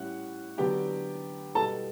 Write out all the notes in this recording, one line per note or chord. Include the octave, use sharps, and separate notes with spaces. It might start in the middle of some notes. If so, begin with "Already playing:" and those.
Already playing: A2 G3 C#4 E4 F#5
D3 F#3 B3 D4 G4 G5
B2 G3 B3 A4 A5